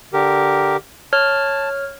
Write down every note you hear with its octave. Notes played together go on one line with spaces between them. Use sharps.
D3 G4 A#4
C#5 A5 F6